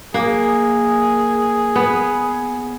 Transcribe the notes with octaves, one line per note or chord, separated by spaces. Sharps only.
A#3 G#4
B3